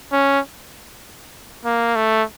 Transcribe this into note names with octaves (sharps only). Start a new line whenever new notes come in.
C#4
A#3
A3